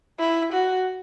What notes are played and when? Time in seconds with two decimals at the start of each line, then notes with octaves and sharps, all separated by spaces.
0.19 E4
0.53 F#4